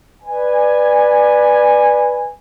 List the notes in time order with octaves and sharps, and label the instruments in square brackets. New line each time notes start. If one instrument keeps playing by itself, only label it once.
[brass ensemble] B4 D5 G#5